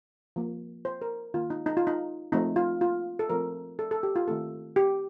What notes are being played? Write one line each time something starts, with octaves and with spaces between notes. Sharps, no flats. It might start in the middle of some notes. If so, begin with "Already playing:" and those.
F3 A#3
C5
A#4
D#3 A#3 F4
D#4
D#4
F4
D#4
F3 A3 C4 D#4
F4
F4
A4
F3 A3 C4 A#4
A4
A4
G4
F4
D#3 A3 C4 A4
G4